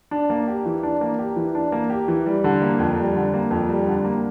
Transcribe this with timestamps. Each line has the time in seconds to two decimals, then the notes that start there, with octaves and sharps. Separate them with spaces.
0.11 D4
0.30 A#3
0.47 G4
0.66 E3
0.83 D4
1.01 A#3
1.19 G4
1.36 E3
1.55 D4
1.72 A#3
1.90 G4
2.08 E3
2.26 G3
2.44 D3
2.62 A#3
2.79 F2
2.97 G3
3.16 D3
3.34 A#3
3.51 F2
3.69 G3
3.87 D3
4.05 A#3